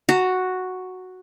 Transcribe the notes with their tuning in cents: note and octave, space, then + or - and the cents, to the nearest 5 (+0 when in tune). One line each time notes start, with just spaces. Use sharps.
F#4 +0 A#5 -40